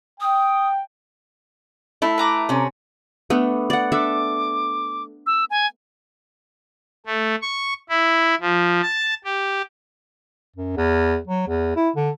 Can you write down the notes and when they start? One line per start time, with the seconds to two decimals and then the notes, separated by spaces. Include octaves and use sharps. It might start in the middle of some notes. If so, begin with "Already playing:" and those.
0.21 G5 D#6
2.02 A3 E4
2.18 B4 A#5 D6
2.49 C3 C#4
3.30 A3 B3 D4
3.70 D5 F#5
3.92 D4 A4 E5 D6
5.27 E6
5.50 G#5
7.06 A3
7.42 C#6
7.89 E4
8.41 F3
8.82 A5
9.24 G4
10.56 F#2
10.77 E2
11.28 F#3
11.48 E2
11.76 E4
11.96 D3